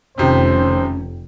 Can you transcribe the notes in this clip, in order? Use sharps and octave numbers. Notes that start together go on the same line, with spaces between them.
F1 F2 C3 D#3 C#4 C5